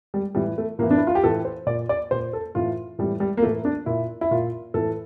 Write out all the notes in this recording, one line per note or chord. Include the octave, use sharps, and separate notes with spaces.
G3
A2 E3 G3
A3
A2 E3 A#3
D4
E4
F4
G4
A2 E3 A4
C5
A#2 D5
D5
A#2 C5
A4
A2 E3 F4
A2 E3 G3
G3
A#3
A2 E3 A3
D4
A#2 E4
E4
A#2 F4
A2 E3 A4